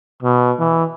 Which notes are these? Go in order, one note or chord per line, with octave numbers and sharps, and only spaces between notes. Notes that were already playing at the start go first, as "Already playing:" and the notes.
B2
E3